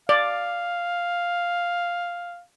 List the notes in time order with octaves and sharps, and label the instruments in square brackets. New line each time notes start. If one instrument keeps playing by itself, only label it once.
[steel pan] D5 [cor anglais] F5